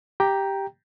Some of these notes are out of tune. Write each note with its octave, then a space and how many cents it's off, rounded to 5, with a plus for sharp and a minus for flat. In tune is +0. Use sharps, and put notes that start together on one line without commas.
G4 +0 G5 +0 A#5 +5